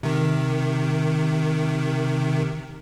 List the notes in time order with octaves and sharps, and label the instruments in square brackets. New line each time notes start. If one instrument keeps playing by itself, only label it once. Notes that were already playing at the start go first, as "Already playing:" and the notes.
[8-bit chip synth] C3 D#3